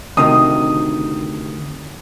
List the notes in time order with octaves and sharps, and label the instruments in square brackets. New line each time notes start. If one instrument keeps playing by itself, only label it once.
[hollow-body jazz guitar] D2 C3 D#3 [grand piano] D#6